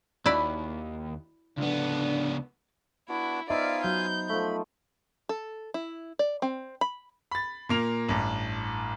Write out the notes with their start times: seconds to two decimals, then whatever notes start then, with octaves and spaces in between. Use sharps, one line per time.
0.26 D#2 E4 F#4 D5 B5
1.58 C#2 D3 B3 D4
3.09 B3 D4 E4 F#4
3.50 B3 D#4 F4 C5 D5 E5 F5 G#5
3.84 F#3 G6
4.29 F3 A3 B5
5.29 A4
5.74 E4
6.19 D5
6.42 C4
6.81 B5
7.31 B5 A6
7.69 A#2 A#3 F7
8.08 A1 G2